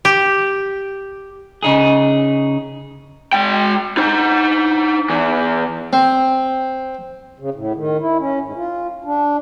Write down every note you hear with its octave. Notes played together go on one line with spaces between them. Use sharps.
G4
C#3 D#4 G#4
G#3 G5
D#4 C5
E3 B3
C4
C#3
A2
D#3
E4
C#4
G#2
F4
D4